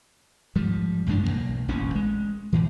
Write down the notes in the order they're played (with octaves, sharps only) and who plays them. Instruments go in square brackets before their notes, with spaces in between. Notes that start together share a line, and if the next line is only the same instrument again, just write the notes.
[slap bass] G#2 F3 G3
A1 F#2 G#3 D4
B1 F#2 A#3
E1 A1 F#2 C#4
G#3
G#2 E3